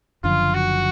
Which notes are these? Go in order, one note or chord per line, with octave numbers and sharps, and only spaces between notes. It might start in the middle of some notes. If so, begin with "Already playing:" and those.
F#1 F#2 D3 F3 F4
F#4